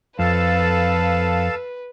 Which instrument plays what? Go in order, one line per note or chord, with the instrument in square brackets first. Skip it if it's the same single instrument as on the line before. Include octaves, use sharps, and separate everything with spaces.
[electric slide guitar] F2 [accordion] A4 F5 A5 [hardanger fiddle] B4